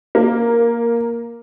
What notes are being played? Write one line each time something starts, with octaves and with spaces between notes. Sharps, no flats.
A#3